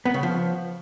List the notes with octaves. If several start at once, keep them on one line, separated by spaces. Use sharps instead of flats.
B3
C#3
F3